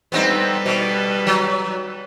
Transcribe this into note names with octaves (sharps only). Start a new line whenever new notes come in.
G3 B3 C4 D#4 A4 B4
B2
F#3